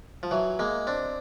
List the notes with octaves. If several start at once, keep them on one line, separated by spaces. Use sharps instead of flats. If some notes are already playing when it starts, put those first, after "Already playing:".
F3
E3 F#3
G#3 A#3
C4 D4